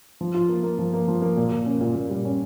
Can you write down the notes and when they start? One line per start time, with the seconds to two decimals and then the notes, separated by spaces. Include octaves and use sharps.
0.21 F3
0.34 F4
0.49 A#3
0.63 A#3
0.79 F3
0.94 A#3
1.08 F3
1.22 A#3
1.37 A#2
1.52 A#2
1.66 C#4
1.81 A#2
1.96 A#2
2.09 G3
2.25 C#4